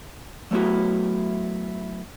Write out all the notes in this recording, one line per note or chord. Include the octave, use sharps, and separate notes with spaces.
F#3 A3 B3 E4 F#4